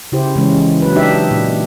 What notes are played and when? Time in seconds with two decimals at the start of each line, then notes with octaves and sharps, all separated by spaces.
0.12 C#3 E4 G4 C5
0.36 C#3 E3 G#3 C#4
0.57 E3
0.82 F#3 B4
0.95 D4 D#4 G4 E5
1.31 A#2